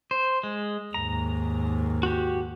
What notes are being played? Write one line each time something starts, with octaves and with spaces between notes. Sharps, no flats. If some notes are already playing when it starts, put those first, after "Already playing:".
C5
G#3
D#2 G#2 A#5
F#4 G4